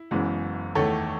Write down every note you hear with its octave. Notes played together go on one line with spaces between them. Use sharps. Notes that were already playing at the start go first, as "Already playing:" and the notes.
Already playing: E4
F#1 F#2 E3 G#3 B3
E2 D#3 A3 A4 C#5